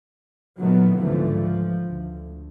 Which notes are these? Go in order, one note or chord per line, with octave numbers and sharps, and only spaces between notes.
A#2 D#3 F#3 A3 B3
C#2 G#2 D3 E3 F3 A3
F3
D2